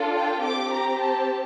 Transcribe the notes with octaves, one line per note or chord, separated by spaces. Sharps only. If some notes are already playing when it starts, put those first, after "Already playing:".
Already playing: D4 F4 A4
G5
C4 G4 D6
A#5
A5